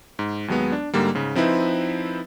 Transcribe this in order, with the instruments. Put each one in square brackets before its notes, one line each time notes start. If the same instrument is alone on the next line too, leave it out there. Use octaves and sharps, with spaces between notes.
[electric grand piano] G#2
D#2 F#3 G#3 B3
D4
G#2 D3 G3 A#3
G#2 C#3
F3 C4 D#4 E4 B4